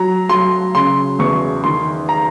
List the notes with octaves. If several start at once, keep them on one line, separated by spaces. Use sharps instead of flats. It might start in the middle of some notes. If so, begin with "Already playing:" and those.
Already playing: F#3 A#5
F#3 C6
C#3 C6
E2 C#6
D#3 C6
A#5